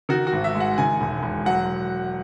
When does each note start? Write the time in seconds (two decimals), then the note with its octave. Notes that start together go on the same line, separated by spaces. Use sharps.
0.09 D#3 F#4
0.27 F#4
0.33 G#1
0.44 E5
0.55 G#3
0.60 F#5
0.78 D#3 G#5
1.00 E1
1.23 E1
1.46 F#3 F#5